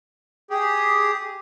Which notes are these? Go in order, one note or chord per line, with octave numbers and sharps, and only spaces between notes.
G4 G#4